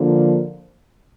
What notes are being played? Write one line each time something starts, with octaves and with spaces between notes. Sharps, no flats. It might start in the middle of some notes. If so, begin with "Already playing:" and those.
Already playing: D3 F3 A#3